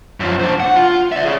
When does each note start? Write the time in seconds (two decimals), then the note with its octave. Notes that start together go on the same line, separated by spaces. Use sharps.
0.20 F#2 F3
0.40 D4 C5
0.60 F#5
0.76 F4
1.12 D5 E5
1.25 G#4 C#5